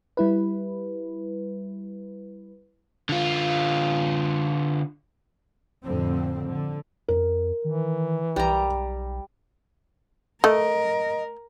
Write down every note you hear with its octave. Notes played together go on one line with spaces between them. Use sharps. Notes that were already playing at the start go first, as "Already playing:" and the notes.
G3 E4 B4
D3 F4
F1 F2 A2 D3 C4
D3
F2 A#4
D#3 E3
B1 G3 A#5
A3 A#4 D#5